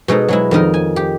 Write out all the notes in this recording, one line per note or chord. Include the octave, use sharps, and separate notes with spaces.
B2 G#3 D#4 A4
F#3 G#3 E4
F2 D#3 D#4 A#4
G#5
G4